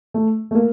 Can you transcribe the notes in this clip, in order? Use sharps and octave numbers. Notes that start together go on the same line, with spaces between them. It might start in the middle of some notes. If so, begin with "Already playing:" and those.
A3
A3
A#3